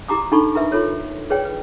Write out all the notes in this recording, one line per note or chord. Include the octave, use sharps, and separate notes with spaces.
E4 G4 A#5 D6 D#6
D4 D#4 A4 B5 C#6
E4 A#4 B4 E5
F4 A4 C#5
G#4 B4 C#5 D5 G5
B4